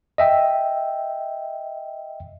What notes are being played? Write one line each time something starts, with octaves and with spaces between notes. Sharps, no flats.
D#5 E5 G5